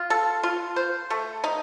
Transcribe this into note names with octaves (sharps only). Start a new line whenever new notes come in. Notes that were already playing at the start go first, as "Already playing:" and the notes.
Already playing: F4
A4
F4
C5
A3
D#4